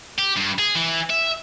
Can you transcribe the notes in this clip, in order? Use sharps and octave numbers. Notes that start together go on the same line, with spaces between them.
G4
G2
G#4
E3
E5